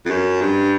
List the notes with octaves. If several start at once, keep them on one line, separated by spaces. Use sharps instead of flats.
F2
F#2
G2